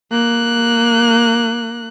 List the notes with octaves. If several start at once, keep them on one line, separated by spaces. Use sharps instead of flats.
A#3 F#6